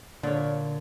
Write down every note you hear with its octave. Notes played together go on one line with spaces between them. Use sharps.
A#2 D3 C#5 D5